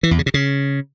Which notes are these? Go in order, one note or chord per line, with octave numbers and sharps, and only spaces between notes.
E3
E2
C#3
C3
C#3